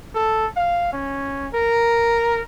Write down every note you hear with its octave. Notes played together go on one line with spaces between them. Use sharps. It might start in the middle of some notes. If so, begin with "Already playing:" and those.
A4
F5
C#4
A#4